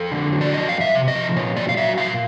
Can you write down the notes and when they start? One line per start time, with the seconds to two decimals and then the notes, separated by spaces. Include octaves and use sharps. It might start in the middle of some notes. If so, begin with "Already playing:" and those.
Already playing: F2 A4
0.11 D3
0.32 F#3
0.41 D5
0.53 F2 D#5
0.69 F2 F5
0.81 E5
0.95 C3
1.08 D#5
1.15 F3
1.35 A#2 C#5
1.57 F#3 D5
1.69 F5
1.77 F#3 E5
1.98 A#2 F5